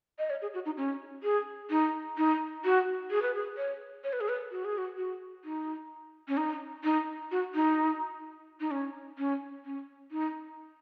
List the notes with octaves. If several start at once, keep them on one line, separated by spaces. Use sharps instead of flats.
D#5
C#5
G#4
F#4
D#4
C#4
G#4
D#4
D#4
F#4
G#4
B4
G#4
C#5
C#5
B4
G#4
B4
F#4
G#4
F#4
F#4
D#4
C#4
D#4
D#4
F#4
D#4
D#4
C#4
C#4
C#4
D#4